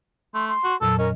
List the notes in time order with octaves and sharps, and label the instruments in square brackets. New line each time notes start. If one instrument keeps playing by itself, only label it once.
[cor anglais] A3 [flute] C6
[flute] C6
[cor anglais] F#4
[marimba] F2 A#2 F#3 [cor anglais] A4 [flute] E6
[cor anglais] C#4 [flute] A#4 [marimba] D#5